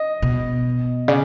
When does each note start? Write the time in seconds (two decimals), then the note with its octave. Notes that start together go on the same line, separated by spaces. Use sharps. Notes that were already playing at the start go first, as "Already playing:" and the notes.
Already playing: D#5
0.22 B2
1.08 C#3 D5